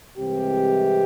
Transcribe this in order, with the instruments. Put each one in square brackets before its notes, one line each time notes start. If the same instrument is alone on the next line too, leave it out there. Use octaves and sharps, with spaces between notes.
[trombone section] C2 C3 E3 G#3 G4